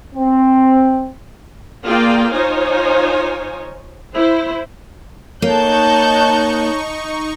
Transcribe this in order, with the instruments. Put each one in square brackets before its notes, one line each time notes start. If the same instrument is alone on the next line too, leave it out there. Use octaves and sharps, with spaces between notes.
[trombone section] C4
[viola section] A#3 F4 G#4 D5 F5 G5
D#4 F4 C5 C#5 G#5
E4 C5
[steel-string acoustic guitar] A#3 [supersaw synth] D#4 C#6 [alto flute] C#5 [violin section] A5 F#6 G6